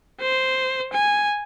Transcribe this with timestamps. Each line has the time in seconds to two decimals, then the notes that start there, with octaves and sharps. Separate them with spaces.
0.21 C5
0.93 G#5